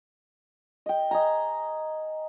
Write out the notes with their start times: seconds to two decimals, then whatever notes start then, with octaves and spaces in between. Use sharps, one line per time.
0.86 D#5 G5
1.11 D#5 G#5 A#5